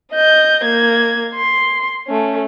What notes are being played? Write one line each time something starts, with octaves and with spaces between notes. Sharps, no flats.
D#5 G6
A#3 G#6
C6
A3 C#4